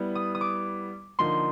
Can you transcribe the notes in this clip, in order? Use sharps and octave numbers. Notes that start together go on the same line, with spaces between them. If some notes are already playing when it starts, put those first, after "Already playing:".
Already playing: G3 B3 E4
D#6
D#6
D6
D3 F3 A#3 D#4 C6